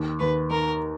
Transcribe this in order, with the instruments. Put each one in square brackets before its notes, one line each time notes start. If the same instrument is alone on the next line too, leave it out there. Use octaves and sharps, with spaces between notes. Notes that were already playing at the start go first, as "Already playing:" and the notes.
Already playing: [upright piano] D#2
[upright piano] D#2 [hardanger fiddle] B4
[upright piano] D#3 [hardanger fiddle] A#4